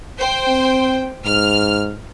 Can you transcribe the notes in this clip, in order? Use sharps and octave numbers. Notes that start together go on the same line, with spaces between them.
C5 G5
C4
G#2 F6